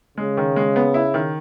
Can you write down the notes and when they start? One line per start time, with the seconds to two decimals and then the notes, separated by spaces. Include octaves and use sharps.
0.18 C#3 G#3
0.37 D#3
0.56 G#3
0.76 B3
0.94 E4
1.14 D#3